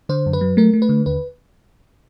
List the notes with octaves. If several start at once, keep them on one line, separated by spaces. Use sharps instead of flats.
D3 C5
F#2
B4
F#3
A3 A#4
A3
B4
D3
D#2 B4